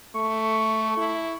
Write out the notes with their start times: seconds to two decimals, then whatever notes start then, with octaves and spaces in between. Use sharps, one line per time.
0.15 A3 C#6
0.97 E4